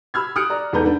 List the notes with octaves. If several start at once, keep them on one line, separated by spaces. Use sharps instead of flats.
B5 E6 F6 G#6
D#6 F6 F#6 C#7 D7
D5 A#5
E2 G#2 A4 B4 A#5 G6
D4 B4